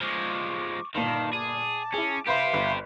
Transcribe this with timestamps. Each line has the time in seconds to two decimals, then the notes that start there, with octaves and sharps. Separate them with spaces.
0.01 F3 G#3 C#6 D6
0.95 G1 A#2 D#3 F5 A5
1.33 G#4 A5 D6
1.94 C#4 E4 G#4
2.27 G4 B4 C5 E5 F5 B5 C6
2.53 G1